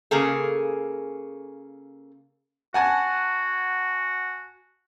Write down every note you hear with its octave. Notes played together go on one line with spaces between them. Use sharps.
C#3 A#3 G#4 A4
F#4 F#5 G#5 A5